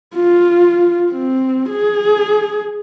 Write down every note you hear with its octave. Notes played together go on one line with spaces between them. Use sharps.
F4
C4
G#4